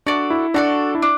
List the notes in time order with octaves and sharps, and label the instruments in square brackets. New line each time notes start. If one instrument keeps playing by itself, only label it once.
[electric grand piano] D4 [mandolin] F#4 A4 D5
[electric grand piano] E4
[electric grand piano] D4 [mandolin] F#4 A4 D5
[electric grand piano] E4
[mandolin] D4